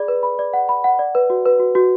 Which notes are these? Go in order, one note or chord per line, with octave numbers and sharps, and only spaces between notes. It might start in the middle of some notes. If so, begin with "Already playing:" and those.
Already playing: G#4 D5 B5
B4
B5
D5
F#5
B5
F#5
D5
B4
F#4
B4
F#4
F#4